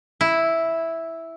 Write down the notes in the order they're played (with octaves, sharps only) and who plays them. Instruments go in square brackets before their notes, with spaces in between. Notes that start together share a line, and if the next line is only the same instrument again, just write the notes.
[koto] E4